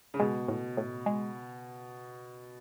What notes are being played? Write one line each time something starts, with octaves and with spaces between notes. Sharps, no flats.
C#3
B2 G#3
A2
A2
G#3